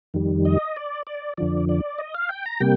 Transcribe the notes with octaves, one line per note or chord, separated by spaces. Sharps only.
F2 D#3 G3
D#5
D5
D5
F2 D3 F3 D5
D5
D#5
F5
G5
A#5
C3 G3 A#3 G5